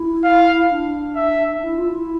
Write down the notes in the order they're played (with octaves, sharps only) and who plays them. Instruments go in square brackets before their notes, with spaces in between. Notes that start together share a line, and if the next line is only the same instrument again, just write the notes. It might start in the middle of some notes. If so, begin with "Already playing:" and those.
Already playing: [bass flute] E4
[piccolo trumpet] F5
[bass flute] D4
[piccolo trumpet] E5
[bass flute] E4
F4
E4